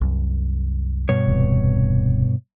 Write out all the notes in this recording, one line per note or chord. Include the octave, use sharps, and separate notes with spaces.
C2 F#2
G2 B2 C#5
D1 E2 C3